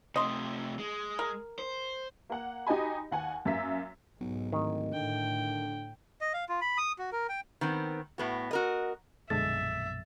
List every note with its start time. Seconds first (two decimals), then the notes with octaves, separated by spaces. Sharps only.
0.16 C3 A3 D#5 C6
0.79 G#3
1.19 A#4
1.59 C5
2.30 A#3 F#5
2.67 D#4 F#4 G4 D#5 G#5 B5
3.11 D#2 F#5 G#5
3.45 F#2 A#3 E5 B6
4.20 B1 G#2
4.52 D1 D#3
4.93 A2 D3 G5
6.21 D#5
6.34 F5
6.49 F4
6.61 B5
6.78 D#6
6.99 F#4
7.12 A#4
7.29 G5
7.61 D#3 B3 C4
8.18 A2 B3 F#4
8.51 F#4 A#4 D#5
9.30 A#1 F#2 B2 D3 G#3 A4 E5 A6